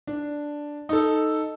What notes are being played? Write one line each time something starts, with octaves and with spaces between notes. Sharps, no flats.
D4
D#4 A4